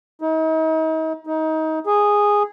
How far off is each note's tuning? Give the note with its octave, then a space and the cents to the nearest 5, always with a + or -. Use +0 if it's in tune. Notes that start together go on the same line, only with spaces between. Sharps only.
D#4 +40
D#4 +25
G#4 -10